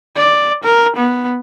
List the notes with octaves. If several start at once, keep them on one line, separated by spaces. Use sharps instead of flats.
D5
A#4
B3